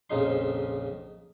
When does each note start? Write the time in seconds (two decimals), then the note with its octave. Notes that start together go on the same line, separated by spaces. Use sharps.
0.10 A#1 F2 C#3 D#4 C6